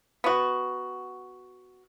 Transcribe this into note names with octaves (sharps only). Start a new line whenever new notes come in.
B3 F#4